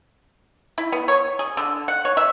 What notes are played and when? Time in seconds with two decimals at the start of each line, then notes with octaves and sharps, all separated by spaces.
0.78 E4
0.92 B3
1.08 C#5
1.39 G#4
1.57 D3
1.88 F#5
2.05 C#5
2.17 E5